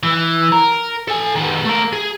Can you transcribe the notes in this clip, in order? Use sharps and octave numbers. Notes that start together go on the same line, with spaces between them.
E3
A#4
A4 G#5
D#3 B3
A3 A#4
G#4